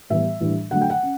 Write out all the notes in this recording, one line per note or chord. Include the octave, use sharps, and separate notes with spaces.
A2 E3 G3 B3 E5
A2 E3 G3 D4
D3 F#3 A3 F#5
G5
F#5
C#4